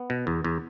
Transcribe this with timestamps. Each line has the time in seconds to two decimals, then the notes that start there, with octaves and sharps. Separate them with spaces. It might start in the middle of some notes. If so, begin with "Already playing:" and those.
Already playing: B3
0.10 B2
0.27 E2
0.44 E2